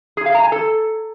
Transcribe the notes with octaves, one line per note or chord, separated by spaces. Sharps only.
G#4
F5
A#5
G#5
A4